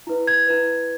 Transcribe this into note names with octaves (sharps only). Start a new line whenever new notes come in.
E4 B4
G#6
E4 B4